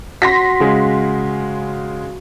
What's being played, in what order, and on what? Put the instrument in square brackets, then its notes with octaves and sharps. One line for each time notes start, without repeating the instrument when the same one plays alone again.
[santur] F#4 [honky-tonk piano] C6 A#6 B6
[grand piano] C#3 G#3